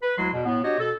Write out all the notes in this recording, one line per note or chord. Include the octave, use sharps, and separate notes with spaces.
B4
D2 F#3 G#3 E4 C6
E2 B2
A2 B3
D4 F#4 G4 C#5 D#5
B2 A4